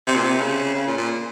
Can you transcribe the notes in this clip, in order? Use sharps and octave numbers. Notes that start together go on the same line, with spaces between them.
C3
A#2
C3
C#3
C#3
A#2
A#2